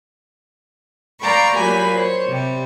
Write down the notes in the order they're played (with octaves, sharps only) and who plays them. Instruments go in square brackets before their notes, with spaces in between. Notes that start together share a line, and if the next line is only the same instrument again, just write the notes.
[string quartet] D5 F5 G5 A#5 B5 C#6
A#2 F#3 A#3 G4 G#5 B5
C5 C#5
C3 G3